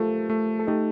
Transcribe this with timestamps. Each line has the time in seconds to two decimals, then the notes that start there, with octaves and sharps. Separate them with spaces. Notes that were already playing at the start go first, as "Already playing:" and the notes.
Already playing: A3 F4 G4 A4 A#4 C5
0.30 A3
0.59 A4
0.67 A3 D#4 G4